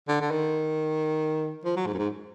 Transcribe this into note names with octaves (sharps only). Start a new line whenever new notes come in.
D3
D3
D#3
F3
F#3
G#2
F#2
G#2